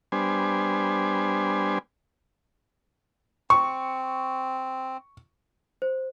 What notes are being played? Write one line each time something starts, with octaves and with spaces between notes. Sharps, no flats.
G3 B3 D4 C5 G#5
C4 C#6
C5